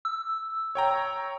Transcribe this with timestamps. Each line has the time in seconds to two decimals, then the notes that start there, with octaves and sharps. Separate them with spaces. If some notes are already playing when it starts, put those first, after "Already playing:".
0.05 E6
0.75 C#5 G5 A#5